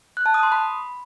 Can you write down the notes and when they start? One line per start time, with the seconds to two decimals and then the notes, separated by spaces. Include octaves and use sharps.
0.17 F#6
0.26 A5
0.34 D#6
0.43 C6
0.52 B5